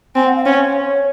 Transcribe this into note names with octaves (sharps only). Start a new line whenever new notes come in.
C4 G#5
F#5
F5
C#4 C#5